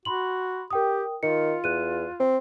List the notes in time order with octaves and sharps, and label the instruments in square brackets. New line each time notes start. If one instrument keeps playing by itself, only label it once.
[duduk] F#4 [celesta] B5 C6 F#7
[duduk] G4 [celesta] A#4 G5 D#6
[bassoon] D#3 [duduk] F4 [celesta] C#7
[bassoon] E2 [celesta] F#6 D#7
[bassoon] C4